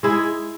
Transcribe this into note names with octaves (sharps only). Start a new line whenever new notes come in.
G#3 E4 G#4